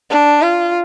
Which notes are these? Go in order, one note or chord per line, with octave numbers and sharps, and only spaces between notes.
D4
F4